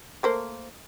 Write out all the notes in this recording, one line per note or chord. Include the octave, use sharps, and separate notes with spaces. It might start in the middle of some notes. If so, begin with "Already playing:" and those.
A3 A#3 C5